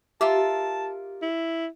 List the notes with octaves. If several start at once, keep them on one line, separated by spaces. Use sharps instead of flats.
F4 G4 A#4 E5 A5
E4